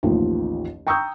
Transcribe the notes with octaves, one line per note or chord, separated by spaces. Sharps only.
A1 D#2 D#3 F3
G5 A#5 C#6 D#6 E6 G6